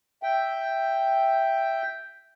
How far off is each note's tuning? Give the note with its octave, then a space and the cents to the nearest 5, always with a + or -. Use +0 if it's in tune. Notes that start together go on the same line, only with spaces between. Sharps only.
E5 +0 G5 +0